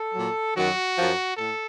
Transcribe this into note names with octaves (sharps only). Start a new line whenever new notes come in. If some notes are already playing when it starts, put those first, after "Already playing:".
Already playing: A4
A#2 F#3
F#2 D#3 F#3 F#4
F#2 F3
A2 A4